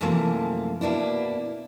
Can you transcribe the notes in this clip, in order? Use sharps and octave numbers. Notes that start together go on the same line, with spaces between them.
F#2 C3 E3 F3 A3 A#3
B2 A#3 D4 E4